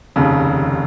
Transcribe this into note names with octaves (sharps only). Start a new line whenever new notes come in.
F1 D#2 C#3